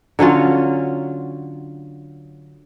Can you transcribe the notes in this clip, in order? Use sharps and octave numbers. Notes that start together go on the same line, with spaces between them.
D3 F#3 C#4 F4